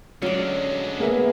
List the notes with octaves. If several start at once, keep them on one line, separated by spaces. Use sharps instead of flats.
D3 F#3 G#3 C#4 D5
A#3 B3 G#4 A#4 E5